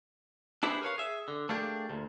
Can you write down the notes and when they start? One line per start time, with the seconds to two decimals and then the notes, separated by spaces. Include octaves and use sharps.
0.63 D4 E4 G4 G#4 B4 C5
0.82 A#4 B4 C#5 F5
0.98 G#4 E5
1.28 D3
1.49 A3 A#3 D4 G4 G#4
1.89 D2 A#2